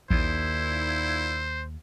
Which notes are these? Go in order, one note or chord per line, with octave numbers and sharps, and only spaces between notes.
A#1 D#2 A#2 D#4 E4 C5